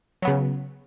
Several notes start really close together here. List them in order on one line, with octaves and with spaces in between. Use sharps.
F#3 B3 C#3